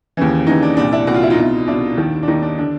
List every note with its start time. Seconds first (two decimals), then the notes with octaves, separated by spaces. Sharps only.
0.17 D#2 C#3 E3
0.46 D#2 C#3 E3 D#4
0.62 D4
0.77 C2 A#2 D4
0.92 D4 E4
1.07 C2 A#2 F#4
1.14 F4
1.23 E4
1.30 D#4 F4
1.38 C2 B2
1.67 C2 B2 D4 E4
1.97 D#2 D#3
2.23 D4
2.27 D#2 D#3 D#4
2.42 D4
2.58 D3 D4